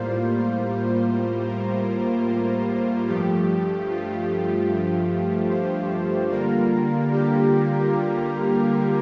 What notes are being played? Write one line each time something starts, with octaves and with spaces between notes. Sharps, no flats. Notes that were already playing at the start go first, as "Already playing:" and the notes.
Already playing: A2 G3 A#3 F4 C5
A#4
G2 F3 A3 G4
F4
G4
C5
D3 G3 A#3 F4 A#4
G4
F4